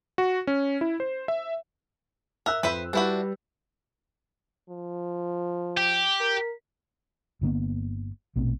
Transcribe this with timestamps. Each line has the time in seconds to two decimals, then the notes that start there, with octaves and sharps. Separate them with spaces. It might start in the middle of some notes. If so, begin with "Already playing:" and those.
0.18 F#4
0.47 C#4
0.81 E4
1.00 C5
1.28 E5
2.46 A#4 E5 E6 F#6
2.63 F2 B4 C5 E5
2.93 G3 D4 E4 F#4 B4 G6
4.69 F3
5.77 G4
6.20 A#4
7.41 G1 D3 A#3 B3
8.36 A#1 B2 A3 C4